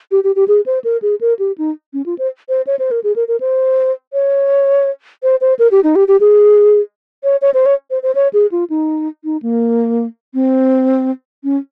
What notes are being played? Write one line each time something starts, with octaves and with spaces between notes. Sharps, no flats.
G4
G4
G4
G#4
C5
A#4
G#4
A#4
G4
D#4
C#4
F4
C5
C5
C#5
C5
A#4
G#4
A#4
A#4
C5
C#5
C5
C5
A#4
G4
D#4
G4
G4
G#4
C#5
C#5
C5
C#5
C5
C5
C#5
G#4
F4
D#4
D#4
A#3
C4
C#4